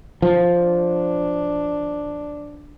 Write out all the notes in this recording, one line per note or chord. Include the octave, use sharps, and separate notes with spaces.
F3
D4